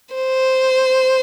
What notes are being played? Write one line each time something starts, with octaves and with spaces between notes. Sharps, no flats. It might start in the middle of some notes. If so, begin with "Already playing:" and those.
C5